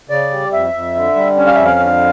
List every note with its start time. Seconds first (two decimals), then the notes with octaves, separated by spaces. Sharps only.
0.10 C#3 D5
0.31 G3
0.52 F2 E5
0.74 F2
0.95 D3
1.16 G3
1.37 C#4
1.47 F5
1.55 F2 E5
1.65 F5
1.80 D3